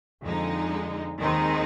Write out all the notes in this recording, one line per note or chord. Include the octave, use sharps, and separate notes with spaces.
F2 D3 G#3 D#4
D#2 D#3 G#3 C4 D#4